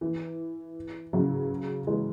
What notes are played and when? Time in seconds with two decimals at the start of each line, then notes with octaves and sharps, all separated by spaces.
0.01 E3
1.13 C#3 F#3
1.87 E3 G#3